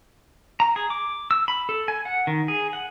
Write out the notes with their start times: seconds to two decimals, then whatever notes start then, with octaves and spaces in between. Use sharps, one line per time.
0.60 A#5
0.76 G#4
0.90 D6
1.31 E6
1.48 B5
1.69 A4
1.88 G#5
2.05 F#5
2.27 D#3
2.48 G#4
2.73 F#5